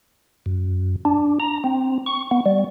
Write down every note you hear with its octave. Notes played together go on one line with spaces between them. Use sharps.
F#2
D4
A#5
C4
C#6
B3
G3